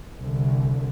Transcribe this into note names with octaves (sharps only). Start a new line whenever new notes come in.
C2 D3